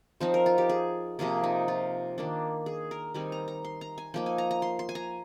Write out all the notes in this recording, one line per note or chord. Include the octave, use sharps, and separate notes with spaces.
F3 C4 D#4 C5
A#4
F4
G4
G#4
C3 F3 A#3 G#4
D#4
F4
D#3 A#3 D4
G#4
A#4
D#3 G3 C4 D#4 G#5
A#5
A#5
C6
A#5
G#5
F3 A#3 D#4 G5
G#5
A#5
A#5
C6
C6
G#5
A#5